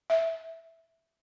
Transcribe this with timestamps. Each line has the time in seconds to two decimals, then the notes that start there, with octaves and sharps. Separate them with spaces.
0.10 E5